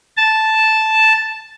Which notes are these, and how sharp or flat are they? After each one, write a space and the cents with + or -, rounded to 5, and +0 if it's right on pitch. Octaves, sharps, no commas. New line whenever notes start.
A5 -5